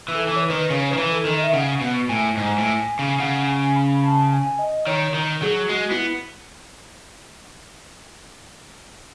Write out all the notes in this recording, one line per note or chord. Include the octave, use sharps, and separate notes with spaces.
E3
A4
E3
C#5
B4
D#3
C#3 C#5
D#3 B4
E3
A4
D#3
D#5
E5
C#3 F#5
B2
A2 G#5
G#2
A2
C#3
C#3 F#5
G#5
B5
A5
G#5
D#5
D#3 C#5
D#3
F#3 G#4
G#3 F#4
B3 E4